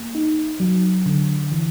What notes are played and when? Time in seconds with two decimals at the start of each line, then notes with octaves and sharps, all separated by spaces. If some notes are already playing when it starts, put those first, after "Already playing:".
Already playing: A#3
0.15 D#4
0.60 F#3
1.06 D3
1.52 E3